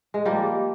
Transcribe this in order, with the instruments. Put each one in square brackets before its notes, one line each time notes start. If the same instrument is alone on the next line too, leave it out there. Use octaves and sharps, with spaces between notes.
[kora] G#3
F3 G3 A#3